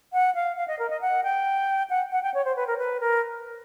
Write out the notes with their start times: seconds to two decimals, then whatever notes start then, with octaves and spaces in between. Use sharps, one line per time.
0.13 F#5
0.35 F5
0.57 F5
0.68 D#5
0.79 A#4
0.90 D#5
1.01 F#5
1.23 G5
1.90 F#5
2.12 F#5
2.23 G5
2.34 C#5
2.45 C5
2.56 B4
2.67 A#4
2.78 B4
3.00 A#4